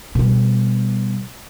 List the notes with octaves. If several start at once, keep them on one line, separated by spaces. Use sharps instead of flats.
B2 G3